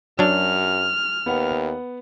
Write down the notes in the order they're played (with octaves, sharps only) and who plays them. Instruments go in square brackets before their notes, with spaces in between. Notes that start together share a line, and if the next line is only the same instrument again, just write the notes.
[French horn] F#2 [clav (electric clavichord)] F#3 D4 [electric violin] F6
[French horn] D#2 [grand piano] B3 F#5